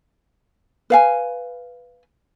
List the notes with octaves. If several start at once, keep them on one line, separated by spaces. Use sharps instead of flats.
B4 F5 G#5